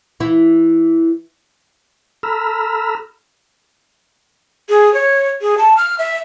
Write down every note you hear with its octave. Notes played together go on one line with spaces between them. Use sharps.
E3 E4
A4 A#5 B5 E6 F6
G#4
C#5
G#4
A5
F6
E5